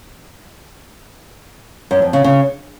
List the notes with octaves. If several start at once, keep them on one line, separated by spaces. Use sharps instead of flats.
F#2
F2
C#3
C#3